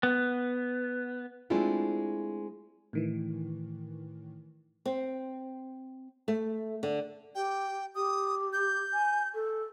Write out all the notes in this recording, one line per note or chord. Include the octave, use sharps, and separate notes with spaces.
B3
G#3 A3 C4 D4 E4 F4
A2 D#3 E3
C4
A3
D3
G4 G5
G4 D#6
G6
G#5
A4